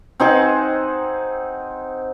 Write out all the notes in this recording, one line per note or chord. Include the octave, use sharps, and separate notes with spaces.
C4 D#4 G#4 F#5